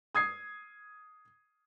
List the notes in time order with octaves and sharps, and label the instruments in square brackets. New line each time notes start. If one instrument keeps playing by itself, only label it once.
[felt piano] D#6 G#6 C7